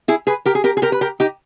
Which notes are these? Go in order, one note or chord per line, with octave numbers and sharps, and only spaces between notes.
E4 G#4
G#4 B4
G4 A#4
G#4
G4 A#4
G#4
G4 A#4
B4
G4 A#4
D#4 G4